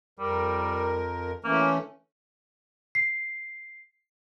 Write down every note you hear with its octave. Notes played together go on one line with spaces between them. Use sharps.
F2 G3 A#4
E3 A3 A#3 C#4
C7